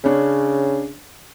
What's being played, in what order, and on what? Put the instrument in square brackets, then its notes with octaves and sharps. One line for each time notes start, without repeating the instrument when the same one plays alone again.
[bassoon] C#3 [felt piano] C#4 D4